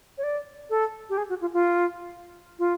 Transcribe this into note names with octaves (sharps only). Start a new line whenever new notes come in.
C#5
D5
A4
G4
G#4
F#4
F4
F4
F4